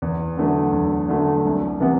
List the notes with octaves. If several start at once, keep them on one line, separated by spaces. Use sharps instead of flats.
E2
D3 F#3 A3
E2
D3 F#3 A3
C2
C3 E3 B3